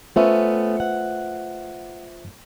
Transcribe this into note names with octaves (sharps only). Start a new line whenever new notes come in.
A3 B3 C#4 F4 C5 E5
F#5